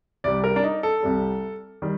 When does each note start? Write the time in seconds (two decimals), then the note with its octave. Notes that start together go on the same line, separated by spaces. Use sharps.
0.24 C2 C3 G3 D5
0.44 A#4
0.56 D4
0.64 D#4
0.83 A4
1.02 C2 C3 G3
1.82 D#3 G3